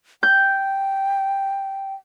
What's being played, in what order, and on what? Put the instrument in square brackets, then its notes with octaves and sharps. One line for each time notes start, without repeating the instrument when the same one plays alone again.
[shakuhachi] G5 [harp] G6